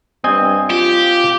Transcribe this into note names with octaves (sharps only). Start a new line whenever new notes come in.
G2 C4 D#5 G#5
F4 G4